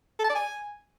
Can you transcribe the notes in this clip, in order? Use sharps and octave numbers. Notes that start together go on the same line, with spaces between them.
A4
A5
D5
G#5